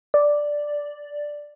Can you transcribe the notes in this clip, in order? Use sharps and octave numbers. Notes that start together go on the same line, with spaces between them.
D5